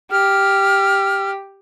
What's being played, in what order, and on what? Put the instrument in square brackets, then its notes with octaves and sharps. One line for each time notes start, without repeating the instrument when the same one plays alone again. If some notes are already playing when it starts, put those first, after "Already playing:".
[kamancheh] G4 [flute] F6